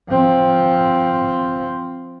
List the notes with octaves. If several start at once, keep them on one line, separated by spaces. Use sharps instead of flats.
F3 C4